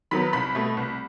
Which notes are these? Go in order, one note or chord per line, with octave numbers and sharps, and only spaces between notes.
D#3 F#3 B3 B5 B6
C2 B5 B6
B2 A3
C2